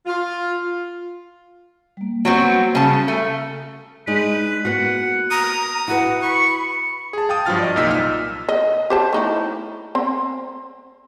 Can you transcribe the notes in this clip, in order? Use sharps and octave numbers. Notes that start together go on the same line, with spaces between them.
F4
G3 A#3
F#3 B3 C4
C#3 A5
A3
G#3 D4 D#4 B4
A#3 B3 F#4 F#5
A#5 D#6
E4 F#4 B4 F#5
B5 C#6
G#4 A5
F5 G5 A5 D#6
G2 F3 F#3 F4 F6 A6
D5 D#5
C2 A#2 D#4 E6 B6
D#5 F6
D#5
G4 C5 A5
A3 D#4 E4
C4 C5